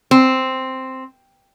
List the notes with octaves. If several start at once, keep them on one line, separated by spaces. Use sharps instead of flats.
C4